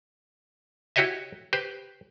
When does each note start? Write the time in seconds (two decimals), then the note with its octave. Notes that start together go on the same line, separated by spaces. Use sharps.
0.96 E4 F#4 G4 C#5 D#5 E5
1.53 G4 B4 C5